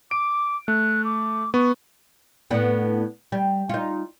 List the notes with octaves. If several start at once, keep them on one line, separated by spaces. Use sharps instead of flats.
D6 D7
A3 F#6
D6
B3 C#6
A2 B3 D4
G3
D#4 F4